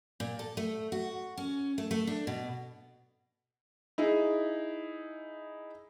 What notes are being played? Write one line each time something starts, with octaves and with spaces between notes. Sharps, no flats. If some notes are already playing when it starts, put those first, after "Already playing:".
A#2
A4
A3
F#4
C#4
A3
A3
D4
B2
D#4 E4 G#4